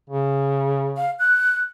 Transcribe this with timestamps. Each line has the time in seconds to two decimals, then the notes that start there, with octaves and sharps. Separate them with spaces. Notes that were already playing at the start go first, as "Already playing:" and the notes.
0.10 C#3
0.97 F5
1.19 F#6